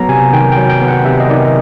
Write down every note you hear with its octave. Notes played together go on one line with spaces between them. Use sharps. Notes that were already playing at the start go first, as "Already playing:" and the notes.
Already playing: F#3 B3 A#5
C3 G#5
D#3 G5
G5
F#3
G5
B3
F#5
C3 E5
D#5
D#3 D5